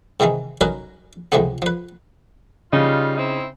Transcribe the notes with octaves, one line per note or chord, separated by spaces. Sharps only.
G#2 C3 D#3 E3 G#3
F#3 C#4 D#4 F#4 A#4 B4
C#2 C3 E3 F3 A3 B3
F3 B4
C#3 G3 D#4 F4
C4 D#4 E4